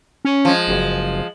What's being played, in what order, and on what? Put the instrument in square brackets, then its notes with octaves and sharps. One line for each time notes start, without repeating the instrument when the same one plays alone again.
[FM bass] C#4
[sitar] F3 G#3
[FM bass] F#1